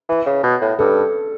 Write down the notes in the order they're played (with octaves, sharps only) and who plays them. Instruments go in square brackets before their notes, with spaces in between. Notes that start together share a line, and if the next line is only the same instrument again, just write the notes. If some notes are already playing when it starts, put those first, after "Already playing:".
[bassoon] E3
C#3
B2
A2
[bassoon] G2 [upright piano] A4